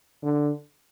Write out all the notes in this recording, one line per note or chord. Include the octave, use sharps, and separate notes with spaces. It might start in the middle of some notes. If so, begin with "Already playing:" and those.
D3